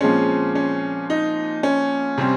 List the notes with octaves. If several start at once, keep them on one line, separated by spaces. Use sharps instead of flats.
A#2 F3 G#3 C4 C#4
C#4
D#4
C#4
C3 G3 C4